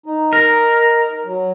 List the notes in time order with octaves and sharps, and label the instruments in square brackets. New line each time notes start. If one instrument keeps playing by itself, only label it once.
[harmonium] D#4
[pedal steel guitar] A#4
[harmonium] F#3